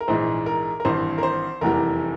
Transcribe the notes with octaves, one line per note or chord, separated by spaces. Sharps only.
A#4
A#1 G#2 E3 G#3 C5
A#4
A#4
G#1 G2 E3 C5
A#4
C5
F1 E2 E3 G3 A#4